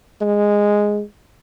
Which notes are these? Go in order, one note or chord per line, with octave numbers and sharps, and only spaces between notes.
G#3